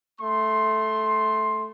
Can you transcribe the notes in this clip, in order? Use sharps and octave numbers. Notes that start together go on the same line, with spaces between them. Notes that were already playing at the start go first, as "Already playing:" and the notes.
A3 C6